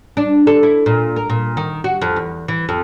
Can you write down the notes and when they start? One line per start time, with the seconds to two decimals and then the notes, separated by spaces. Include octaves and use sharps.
0.17 D4
0.47 A4
0.63 E4
0.86 A#2
1.16 A#4
1.30 A#2
1.57 D#3
1.84 F#4
2.02 F2
2.16 E2
2.48 E3
2.69 F2